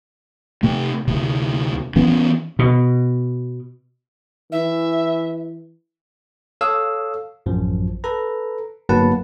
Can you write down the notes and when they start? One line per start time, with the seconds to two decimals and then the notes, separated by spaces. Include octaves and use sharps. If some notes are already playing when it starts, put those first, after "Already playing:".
0.63 C3 A3
1.08 D2 C3
1.96 E3 B3 C#4
2.59 B2
4.52 E3 E5
6.61 A4 C#5 F5 D#6 E6
7.46 A1 F#2 F3
8.04 A4 B4 A#5
8.89 G1 F#3 A#3 B4 F#5 A5